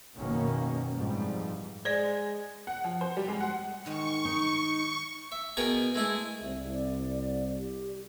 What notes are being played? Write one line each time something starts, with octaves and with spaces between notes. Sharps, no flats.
F#1 B2 D#3 A#3 C#4
F2 G#2 E3 F3 G3
G#3 C5 D5
F#5
F3
C5
G3
G#3
F#5
G#2 D#3 G#3 C#6
D#4
E5
B2 B3 G#4 A#4 G5 C#6
G#3 A3 E4 G#4
C2 E5
D5
G4